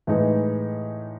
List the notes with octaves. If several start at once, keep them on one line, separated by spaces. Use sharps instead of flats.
A2 E3 G#3 D#4